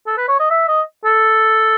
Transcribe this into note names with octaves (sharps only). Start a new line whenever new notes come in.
A4
B4
C#5
D#5
E5
D#5
A4